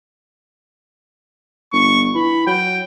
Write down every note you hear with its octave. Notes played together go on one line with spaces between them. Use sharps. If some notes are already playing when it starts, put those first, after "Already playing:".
G1 C#6
E3 B5
F#3 G5